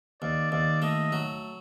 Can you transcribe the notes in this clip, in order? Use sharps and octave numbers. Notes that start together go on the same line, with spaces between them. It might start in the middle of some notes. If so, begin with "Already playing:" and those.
D#2 D5
D#2 D5
A3 D#5
F#3